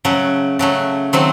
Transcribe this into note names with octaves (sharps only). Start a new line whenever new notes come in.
C#3 F#3 A3
C#3 F#3 A3
D#3 F#3 A3 C4